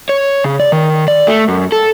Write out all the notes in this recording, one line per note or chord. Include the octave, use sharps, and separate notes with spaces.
C#5
C#3
D5
D#3
D5
A3
F#2
A4